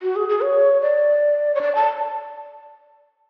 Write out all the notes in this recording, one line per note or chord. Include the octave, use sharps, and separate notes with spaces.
F#4
G#4
G#4
C#5
D5
C#5
D5
A5